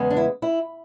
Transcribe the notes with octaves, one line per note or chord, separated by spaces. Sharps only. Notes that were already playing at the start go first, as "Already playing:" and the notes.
Already playing: E2 C#3 G#3 B3
D4
E4
E4